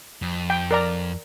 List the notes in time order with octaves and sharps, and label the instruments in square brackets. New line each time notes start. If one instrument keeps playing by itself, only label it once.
[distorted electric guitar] F2
[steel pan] G5
A#4 D5 A#5